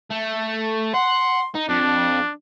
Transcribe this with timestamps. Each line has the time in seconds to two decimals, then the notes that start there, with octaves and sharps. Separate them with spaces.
0.11 A3
0.94 F#5 C6
1.55 D#4
1.69 F2 D4